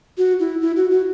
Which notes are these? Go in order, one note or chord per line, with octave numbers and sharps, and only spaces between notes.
F#4
E4
E4
F#4
F#4